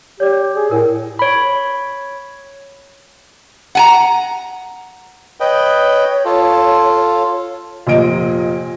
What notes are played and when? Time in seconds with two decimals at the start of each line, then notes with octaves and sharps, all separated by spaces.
0.20 G4 C#5 D5
0.56 G#4
0.71 A2 A#4
1.19 C#5 B5
3.75 F#5 G#5 A#5
5.40 B4 C#5 D#5 G5
6.25 F4 A4
7.87 F1 A#2 D#5 D7